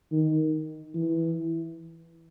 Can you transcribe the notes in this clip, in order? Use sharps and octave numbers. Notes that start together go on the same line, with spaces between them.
D#3
E3